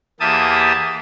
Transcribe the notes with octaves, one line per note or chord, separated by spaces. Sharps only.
E2 A#3 G4 E5 A5 D#6